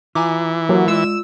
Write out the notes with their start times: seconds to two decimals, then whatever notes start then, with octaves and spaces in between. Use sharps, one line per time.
0.15 E3 F4 G#5 A#5 D6
0.69 F#3 A#3 G4 A#4
0.88 G#3 F4 D5 E6